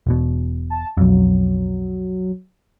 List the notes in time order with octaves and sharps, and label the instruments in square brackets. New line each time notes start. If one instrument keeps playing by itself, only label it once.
[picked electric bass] E1 B2
[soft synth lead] A5
[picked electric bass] B1 F2 [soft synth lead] F#3